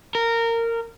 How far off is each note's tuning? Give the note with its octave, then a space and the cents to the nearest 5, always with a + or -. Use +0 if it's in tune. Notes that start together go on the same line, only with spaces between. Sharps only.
A#4 -15